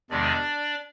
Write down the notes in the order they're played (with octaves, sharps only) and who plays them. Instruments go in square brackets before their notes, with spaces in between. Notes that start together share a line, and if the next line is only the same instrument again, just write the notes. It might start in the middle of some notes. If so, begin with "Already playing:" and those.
[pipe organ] E2 C3 D#3 G#3 D4 D5